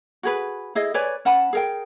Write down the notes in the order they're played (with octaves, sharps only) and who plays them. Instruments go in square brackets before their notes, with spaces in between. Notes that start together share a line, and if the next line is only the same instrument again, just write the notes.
[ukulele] F#4 G#4 B4
E4 G#4 D#5
B4 C#5 D5 G#5
C#4 F#5 A5 B5
G#4 A#4 G5